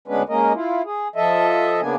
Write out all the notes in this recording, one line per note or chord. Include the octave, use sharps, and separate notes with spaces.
D2 G#3 B3 C#4 D4 B4
G#3 A#3 C#4 A#4 D#5
E4 F4
G#4
F3 A4 D#5 E5
C#3 A#3 B3 D4 G#5